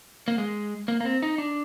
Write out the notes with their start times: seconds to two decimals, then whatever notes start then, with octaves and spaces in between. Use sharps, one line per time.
0.28 A#3
0.38 G#3
0.88 A#3
1.00 A#3
1.05 C4
1.22 D#4
1.38 D4